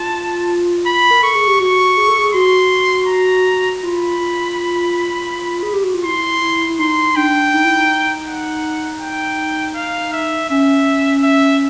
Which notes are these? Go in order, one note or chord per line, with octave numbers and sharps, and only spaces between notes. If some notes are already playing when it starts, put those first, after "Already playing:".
Already playing: F4 A5
B5
A#4
A4 C#6
G#4
G4
F#4 C#6
G#4
A4
G#4
F#4 C6
A#5
F4 B5
F4
G#4
G4
F#4
F4
E4 C6
E4
E4
D#4 C6
D4 G5
D#4
E4
D#4
F#5
G5
F5
E5
C#4 E5
E5